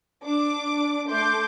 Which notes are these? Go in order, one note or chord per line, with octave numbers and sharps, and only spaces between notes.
D4 D6
A3 C6 D6 G6